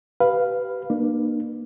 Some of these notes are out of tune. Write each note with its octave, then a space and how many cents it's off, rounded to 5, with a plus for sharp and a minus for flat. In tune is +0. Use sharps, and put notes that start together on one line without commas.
G4 -30 B4 +0 F5 +0
A#3 +20 D4 +45